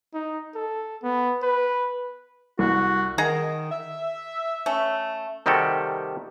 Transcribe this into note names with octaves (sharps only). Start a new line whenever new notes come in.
D#4
A4
B3
B4
C2 F#4
D#3 G#4 F#5 A#5
E5
A3 C#4
C3 D#3 G3 F#4 G4 A4